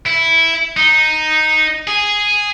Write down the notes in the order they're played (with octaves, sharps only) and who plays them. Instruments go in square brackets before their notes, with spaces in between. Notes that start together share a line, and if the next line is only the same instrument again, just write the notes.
[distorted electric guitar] E4
D#4
G#4